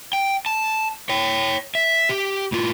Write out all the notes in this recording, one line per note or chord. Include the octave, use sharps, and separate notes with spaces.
G5
A5
C#5 G5
E5
G4
A2 F4